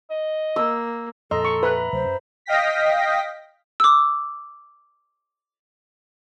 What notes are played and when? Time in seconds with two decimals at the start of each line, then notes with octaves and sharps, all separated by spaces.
0.10 D#5
0.56 A#3 E6
1.31 F2 A#2 A4 D#5 A#5 C6 E6
1.45 C#6
1.63 B4 E5 A#5 B5
1.93 D2 C3 F#3 C5
2.04 F#2
2.46 D#5 F5 G5 A#6 B6
3.80 D6 E6